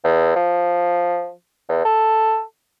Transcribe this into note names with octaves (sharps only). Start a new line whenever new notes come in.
E2
F3
E2
A4